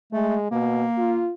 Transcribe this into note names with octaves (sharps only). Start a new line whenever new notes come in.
G#3 A3
B2 A#3
F4